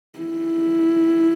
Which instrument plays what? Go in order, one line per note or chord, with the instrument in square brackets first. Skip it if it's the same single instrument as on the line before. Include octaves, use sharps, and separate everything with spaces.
[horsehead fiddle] E4